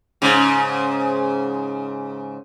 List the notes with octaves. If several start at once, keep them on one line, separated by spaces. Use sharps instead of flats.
G#2 C#3